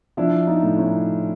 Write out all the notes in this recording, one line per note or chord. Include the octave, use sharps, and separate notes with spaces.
F3 D4 E4
D#4 F4
A2
C#4 D#4